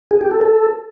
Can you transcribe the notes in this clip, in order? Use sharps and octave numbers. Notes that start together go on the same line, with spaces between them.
G#4
G4
A4
A4